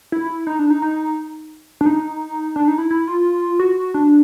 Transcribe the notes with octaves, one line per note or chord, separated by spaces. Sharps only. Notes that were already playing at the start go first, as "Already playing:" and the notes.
E4
D#4
D4
D#4
D#4
D4
D#4
D4
D#4
E4
E4
F4
F#4
D4